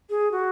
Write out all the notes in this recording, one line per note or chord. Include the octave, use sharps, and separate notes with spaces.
G#4
F#4